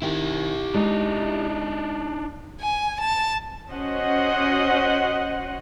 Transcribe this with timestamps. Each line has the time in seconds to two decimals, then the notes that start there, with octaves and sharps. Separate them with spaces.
0.02 D#3 E4 G4
0.74 G#3 D4 D#4 D#5
2.61 G#5
3.00 A5
3.70 C#4 F#4 C5 D#5 F#5